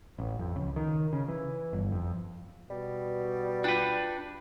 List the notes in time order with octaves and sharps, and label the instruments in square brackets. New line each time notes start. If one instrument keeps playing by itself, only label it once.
[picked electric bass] A1
F2
C#2
D#3
C#3
E3
G1
F2
[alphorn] B2 [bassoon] G3
[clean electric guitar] D4 B4 [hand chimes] F4 G5